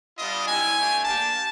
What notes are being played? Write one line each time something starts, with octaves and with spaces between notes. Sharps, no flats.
G3 B3 D4 F4 D#5
G3 C4 E4 G4 G#5
A3 D4 G4
A#3 D4 G4 A5